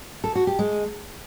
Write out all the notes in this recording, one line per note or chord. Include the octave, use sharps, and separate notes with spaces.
A4
F#4
G4
G#3